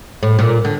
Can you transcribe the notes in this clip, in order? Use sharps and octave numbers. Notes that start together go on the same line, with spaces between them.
A2
A#2
D3